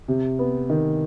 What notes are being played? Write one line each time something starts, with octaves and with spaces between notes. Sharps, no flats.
C3
B3
D#3